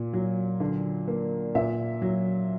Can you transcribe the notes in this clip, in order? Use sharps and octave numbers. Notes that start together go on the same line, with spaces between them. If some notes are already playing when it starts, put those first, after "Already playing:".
Already playing: A#2
F#3
D3
A#3
A#2 E5
F#3